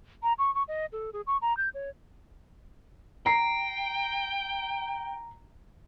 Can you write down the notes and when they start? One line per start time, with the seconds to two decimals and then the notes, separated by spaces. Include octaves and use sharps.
0.23 A#5
0.39 C#6
0.55 C#6
0.68 D#5
0.92 A4
1.13 G#4
1.27 C#6
1.42 A#5
1.57 G6
1.74 C#5
3.26 G5 A#5 C7